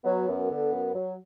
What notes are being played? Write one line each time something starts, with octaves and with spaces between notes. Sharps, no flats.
F#3 B3
F#2
D3
F#2
F#3